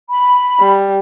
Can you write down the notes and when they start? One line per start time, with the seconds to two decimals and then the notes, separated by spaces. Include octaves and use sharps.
0.10 B5
0.60 G3